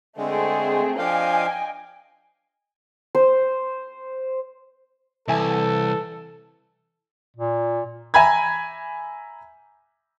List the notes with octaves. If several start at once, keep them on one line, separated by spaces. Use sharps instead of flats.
D3 G#3 A3 C4 G#4
F3 D4 D#5 F5 G5 G#5
C5
C2 E3 A4 E5 G#5
A#2
E5 G#5 A#5 B5 G#6